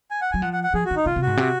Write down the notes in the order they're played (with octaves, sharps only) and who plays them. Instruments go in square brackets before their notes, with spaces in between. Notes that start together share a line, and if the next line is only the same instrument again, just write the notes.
[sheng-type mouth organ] G#5
F#5
[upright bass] F#3 [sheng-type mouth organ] G#5
[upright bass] F3 [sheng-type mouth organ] F#5
[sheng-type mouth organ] F#5
F#5
[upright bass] F3 [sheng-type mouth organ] G#4
[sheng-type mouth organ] F#4
[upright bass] D#3
[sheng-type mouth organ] D#4
[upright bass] C#3 [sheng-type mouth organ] F4
[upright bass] C3
[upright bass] G#2 [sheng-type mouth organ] F#4
[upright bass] C3